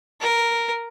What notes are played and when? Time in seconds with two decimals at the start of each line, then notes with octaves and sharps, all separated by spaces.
0.21 A#4